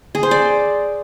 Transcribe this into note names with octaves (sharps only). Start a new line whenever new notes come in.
G#4
C5
D5